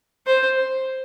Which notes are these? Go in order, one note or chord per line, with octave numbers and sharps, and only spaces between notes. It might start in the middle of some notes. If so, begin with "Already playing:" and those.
C5